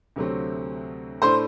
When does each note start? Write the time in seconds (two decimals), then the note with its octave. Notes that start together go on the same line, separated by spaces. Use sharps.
0.16 D2 C3 F#3 A3 C4
1.22 A2 A3 D4 C5 C6